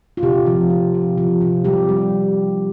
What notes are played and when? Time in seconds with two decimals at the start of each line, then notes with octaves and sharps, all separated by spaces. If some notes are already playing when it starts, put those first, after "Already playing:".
0.17 F4
0.23 C3 G4
0.47 F3
0.70 C3
0.94 C3
1.18 F3
1.41 C3
1.64 G3 G4
1.89 G3